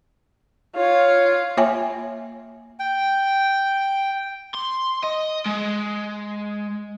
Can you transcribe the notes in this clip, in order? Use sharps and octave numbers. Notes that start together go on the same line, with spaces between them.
F4 C#5
A#3 F4 C#5 E5 G5 G#5
G5
C6
D#5
G#3